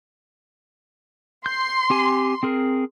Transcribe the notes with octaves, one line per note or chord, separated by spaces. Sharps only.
C6 G6
C4 G4 G#5
C4 G#4 A#4